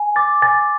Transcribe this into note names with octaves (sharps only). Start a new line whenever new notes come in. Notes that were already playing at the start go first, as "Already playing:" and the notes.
Already playing: G#5
D6 A6
G#5 A6